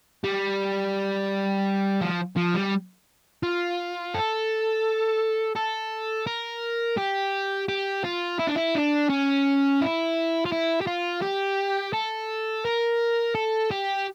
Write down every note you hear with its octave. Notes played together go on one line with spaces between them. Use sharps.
G3
F3
F3
G3
F4
A4
A4
A#4
G4
G4
F4
E4
D4
E4
D4
C#4
E4
F4
E4
G4
F4
G4
A4
A#4
A4
G4